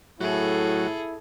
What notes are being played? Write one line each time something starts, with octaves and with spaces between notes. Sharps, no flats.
A2 F#3 E4 F#4 G#4 A4